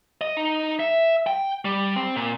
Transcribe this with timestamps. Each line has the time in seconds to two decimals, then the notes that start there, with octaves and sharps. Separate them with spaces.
0.21 D#5
0.37 D#4
0.80 E5
1.27 G5
1.65 G3
1.96 C4
2.16 A#2